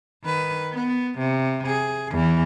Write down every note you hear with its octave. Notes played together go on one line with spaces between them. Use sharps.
D#3 B4
B3
C3
G#4
E2 E3